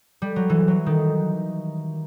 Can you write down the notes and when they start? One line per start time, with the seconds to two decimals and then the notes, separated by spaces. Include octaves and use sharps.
0.22 G3
0.36 F#3
0.50 E3
0.68 F#3
0.86 D#3